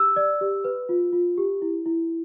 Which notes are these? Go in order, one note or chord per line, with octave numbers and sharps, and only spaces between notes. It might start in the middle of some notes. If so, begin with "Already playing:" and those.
Already playing: G4 E6
D5
G4
B4
F4
F4
G4
E4
E4